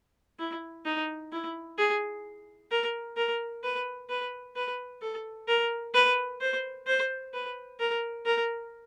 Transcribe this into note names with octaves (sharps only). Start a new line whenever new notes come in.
E4
D#4
E4
G#4
A#4
A#4
B4
B4
B4
A4
A#4
B4
C5
C5
B4
A#4
A#4